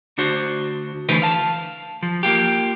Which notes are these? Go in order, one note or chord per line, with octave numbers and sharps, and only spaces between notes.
D2 D4 F#4 C5
D3 E3 A3 E4 B4 C5
F5 A5
F3
A#3 F4 G4